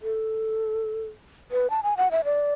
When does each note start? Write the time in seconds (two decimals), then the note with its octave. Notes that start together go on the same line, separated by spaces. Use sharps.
0.02 A4
1.51 B4
1.70 A5
1.83 G#5
1.97 F#5
2.11 E5
2.24 D5